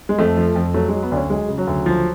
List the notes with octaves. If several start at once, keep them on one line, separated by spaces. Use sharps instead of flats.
G#3
F2 A3
F3
F2
F#3 A3
G#3
F#3
B3
D2 C#4 D4
F#3 G#3
C#3
F#3
D2
F3